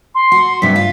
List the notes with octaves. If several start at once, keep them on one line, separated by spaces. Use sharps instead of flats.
C6
F#4
G2 C3 B6
F4